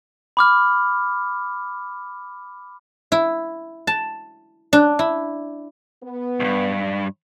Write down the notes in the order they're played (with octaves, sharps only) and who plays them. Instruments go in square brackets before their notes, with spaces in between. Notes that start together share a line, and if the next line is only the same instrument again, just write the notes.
[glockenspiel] B5 D6 F6
[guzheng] E4
A5
D4
E4
[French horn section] B3
[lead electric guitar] C2 G2